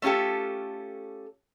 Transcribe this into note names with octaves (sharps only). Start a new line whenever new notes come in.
A3 C#4 F4 G4 A4